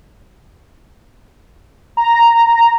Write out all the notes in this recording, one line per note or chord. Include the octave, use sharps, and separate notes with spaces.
A#5